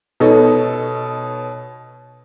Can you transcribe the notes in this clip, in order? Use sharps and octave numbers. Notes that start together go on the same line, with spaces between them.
B2 D#4 A4 C#5